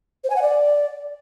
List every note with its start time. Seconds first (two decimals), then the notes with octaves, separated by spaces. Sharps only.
0.24 C5
0.30 G#5
0.36 F#5
0.42 D5